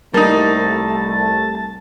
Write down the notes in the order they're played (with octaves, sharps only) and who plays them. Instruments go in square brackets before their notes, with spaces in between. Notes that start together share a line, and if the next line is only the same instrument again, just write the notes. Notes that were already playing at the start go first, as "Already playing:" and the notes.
[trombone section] C2 A3 [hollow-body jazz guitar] G3 [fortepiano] A#3 D#4 [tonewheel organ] A5